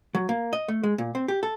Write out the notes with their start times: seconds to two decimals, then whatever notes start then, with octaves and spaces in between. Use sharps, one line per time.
0.15 F#3
0.29 A#3
0.53 D#5
0.68 A3
0.83 G#3
0.98 A#2
1.15 C4
1.28 G4
1.43 A4